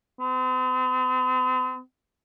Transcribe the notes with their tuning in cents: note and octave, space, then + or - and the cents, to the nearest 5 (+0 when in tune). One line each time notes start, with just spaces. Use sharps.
C4 -45